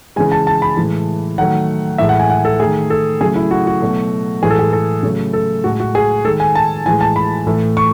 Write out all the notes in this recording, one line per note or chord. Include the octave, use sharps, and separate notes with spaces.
C#3 E3 G#3 G#5
A5
A5
B5
A2 E3 G#3
D#3 F#3 A3 F#5
A2 E3 G#3 E5
F#5
G#5
F#5
A4
D#3 A3 G#4
A4
C#3 F#3 A3 G#4
E4
F#4
F#4
B2 F#3 A3
A2 E3 G#3 G#4
A4
G#4
A4
C#3 F#3 A3
A4
A2 G#3 F#4
F#4
G#4
D#3 G#3 A4
G#5
A5
A2 E3 G#3 G#5
A5
B5
A2 E3 A3
C#6